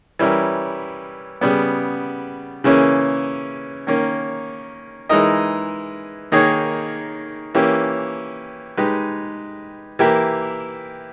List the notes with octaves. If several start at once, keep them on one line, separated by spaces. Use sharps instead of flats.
E3 G3 C#4 E4 A#4
C#3 G3 B3
C#3 E3 A#3 C#4
D#3 A#3 C#4
E3 G#3 D#4 A#4 D#5
D#3 A#3 D#4 G#4 C#5
E3 A#3 C#4 G4
G#3 D#4 G4 B4
E3 A#3 E4 G4 A#4